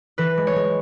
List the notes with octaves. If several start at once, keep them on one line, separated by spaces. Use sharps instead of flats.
E3 B4
G#3
C#5
G#3